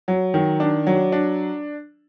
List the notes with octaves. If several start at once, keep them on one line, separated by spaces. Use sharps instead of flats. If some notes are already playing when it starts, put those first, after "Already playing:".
F#3
D#3
D4
F#3
D4